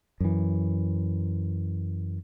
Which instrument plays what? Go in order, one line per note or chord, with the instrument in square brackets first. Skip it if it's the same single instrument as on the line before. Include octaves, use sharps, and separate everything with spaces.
[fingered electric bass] F#2 E3